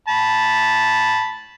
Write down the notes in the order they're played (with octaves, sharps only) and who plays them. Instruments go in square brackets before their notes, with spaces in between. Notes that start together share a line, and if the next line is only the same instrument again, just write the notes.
[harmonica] A5 B5